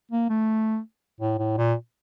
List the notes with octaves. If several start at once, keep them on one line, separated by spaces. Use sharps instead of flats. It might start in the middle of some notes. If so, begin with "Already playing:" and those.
A#3
A3
A2
A2
A#2